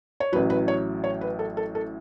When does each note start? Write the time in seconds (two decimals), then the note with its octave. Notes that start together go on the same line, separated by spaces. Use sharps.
0.20 C#5
0.32 A1 A2 F#3 B4
0.50 B4
0.68 C#5
1.04 C#5
1.21 B4
1.39 A4
1.57 A4
1.75 A4